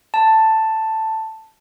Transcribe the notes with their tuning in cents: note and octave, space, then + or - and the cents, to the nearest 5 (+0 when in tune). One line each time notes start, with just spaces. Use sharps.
A5 +5